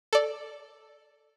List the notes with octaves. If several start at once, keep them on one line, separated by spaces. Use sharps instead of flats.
A4 D5